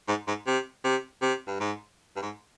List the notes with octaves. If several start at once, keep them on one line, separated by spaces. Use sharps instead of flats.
G#2
G#2
C3
C3
C3
G2
G#2
G2
G#2